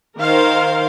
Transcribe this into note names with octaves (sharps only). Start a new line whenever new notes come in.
D#3 A#4 C5 F5